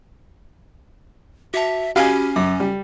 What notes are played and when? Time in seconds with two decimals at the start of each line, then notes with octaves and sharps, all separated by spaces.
1.54 F#4 E5 A5
1.96 C#4 F#4 G4 F5 G#5 B5
2.36 F#2 D6
2.60 G3